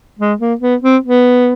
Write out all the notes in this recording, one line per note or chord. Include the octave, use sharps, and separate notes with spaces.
G#3
A#3
B3
C4
B3